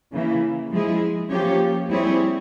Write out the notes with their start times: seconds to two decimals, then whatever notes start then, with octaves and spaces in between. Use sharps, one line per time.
0.11 C#3 E3 A#3 E4
0.70 F3 G#3 E4 G#4
1.30 F3 A#3 C#4 G4 C#5
1.90 G3 C4 E4 G#4 C#5